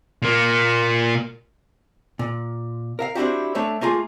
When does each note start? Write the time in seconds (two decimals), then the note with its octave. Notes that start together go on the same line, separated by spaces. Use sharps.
0.22 A#2 A#3
2.19 A#2
2.99 A#4 E5 F5
3.15 C4 D4 E4 F#4 G4
3.55 A3 D4 C#5 E5
3.81 A3 A#3 F4 G#4